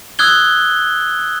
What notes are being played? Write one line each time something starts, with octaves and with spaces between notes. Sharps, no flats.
D#6 E6 F#6 G#6 G7